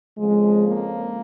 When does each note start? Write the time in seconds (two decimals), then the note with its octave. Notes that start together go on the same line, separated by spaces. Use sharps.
0.18 F2 C#3 F3 G#3
0.66 A#3